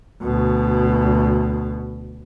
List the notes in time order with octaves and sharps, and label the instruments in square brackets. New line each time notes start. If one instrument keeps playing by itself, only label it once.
[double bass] D2 B2